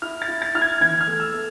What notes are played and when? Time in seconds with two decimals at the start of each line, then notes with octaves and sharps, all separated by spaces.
0.02 E4 F6
0.22 A6
0.28 E4
0.42 A6
0.55 E4 F6
0.61 G#6
0.81 E3 G#6
1.01 F6
1.07 A3
1.20 E6
1.33 A3